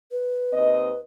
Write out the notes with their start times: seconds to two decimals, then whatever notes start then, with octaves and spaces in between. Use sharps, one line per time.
0.11 B4
0.53 D#2 C4 D#5